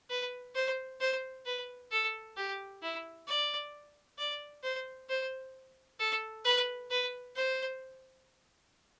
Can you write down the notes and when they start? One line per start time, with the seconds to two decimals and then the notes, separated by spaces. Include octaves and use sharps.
0.10 B4
0.55 C5
1.00 C5
1.46 B4
1.92 A4
2.37 G4
2.82 E4
3.28 D5
4.19 D5
4.64 C5
5.10 C5
6.00 A4
6.45 B4
6.91 B4
7.36 C5